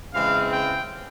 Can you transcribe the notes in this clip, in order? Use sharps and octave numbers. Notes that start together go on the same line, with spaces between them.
C#3 E3 G#3 C4 F5
G5